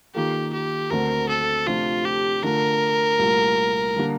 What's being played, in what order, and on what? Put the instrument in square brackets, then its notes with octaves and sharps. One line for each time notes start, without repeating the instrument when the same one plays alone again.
[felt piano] D#3 A#3 F4 A4 [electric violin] G4
[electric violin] G4
[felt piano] D2 D3 A3 C4 [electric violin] A#4
[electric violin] A4
[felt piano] C3 F3 A3 D4 [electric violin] F4
[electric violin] G4
[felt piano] D3 A3 D4 F4 [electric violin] A#4
[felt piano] C2 A#2 A3
D3 G3 A#3 D4